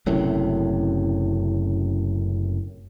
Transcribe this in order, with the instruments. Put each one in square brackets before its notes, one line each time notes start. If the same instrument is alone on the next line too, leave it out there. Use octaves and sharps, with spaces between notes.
[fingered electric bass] F#1 F#2 A2 C3